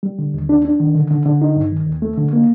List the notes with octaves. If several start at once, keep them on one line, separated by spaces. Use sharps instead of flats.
G3
D3
D#2
D4
D4
D#3
D3
D3
D3
D#4
G2
D#3
D#2
A3
D3
A#3